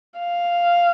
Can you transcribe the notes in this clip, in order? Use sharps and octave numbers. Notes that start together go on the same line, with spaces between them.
F5